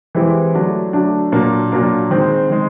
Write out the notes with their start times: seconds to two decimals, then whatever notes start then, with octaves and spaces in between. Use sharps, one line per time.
0.15 E3 G#3 C4 E4 G4
0.55 D3 F#3 A3 D4
0.93 D3 F#3 A3 D4
1.32 A#2 F#3 A#3 D4
1.72 A#2 F#3 A#3 D4
2.11 D#3 G#3 C4
2.50 D#3 G#3